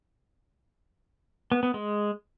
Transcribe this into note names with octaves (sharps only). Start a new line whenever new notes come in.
B3
B3
G#3